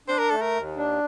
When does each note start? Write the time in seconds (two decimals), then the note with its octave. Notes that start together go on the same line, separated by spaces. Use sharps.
0.08 D4 C5
0.19 A#4
0.31 A3 A4
0.42 A#4
0.55 D#2
0.77 D4